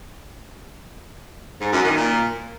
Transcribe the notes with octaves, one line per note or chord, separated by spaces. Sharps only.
G#2
F#2
D#3
A#2